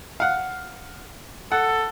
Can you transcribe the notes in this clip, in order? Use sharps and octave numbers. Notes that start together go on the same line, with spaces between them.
F5 F#5
A4 F#5